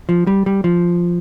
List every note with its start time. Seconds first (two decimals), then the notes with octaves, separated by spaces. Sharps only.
0.09 F3
0.27 G3
0.46 G3
0.64 F3